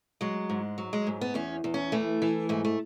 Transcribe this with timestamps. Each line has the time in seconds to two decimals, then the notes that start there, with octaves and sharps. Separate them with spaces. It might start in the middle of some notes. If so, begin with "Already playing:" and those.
0.21 F#3 G#3
0.50 G#2
0.78 F#3
0.93 G#3
1.07 G#2
1.21 B3
1.35 E2 C#4
1.64 E2
1.74 C#4
1.92 E3 A3
2.22 E3
2.49 G#2 A3
2.65 A3